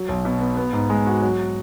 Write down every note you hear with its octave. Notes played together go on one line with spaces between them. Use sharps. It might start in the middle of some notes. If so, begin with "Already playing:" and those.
Already playing: F#3
B1
B2
B3
B3
G#2
G#3
F#4
F#3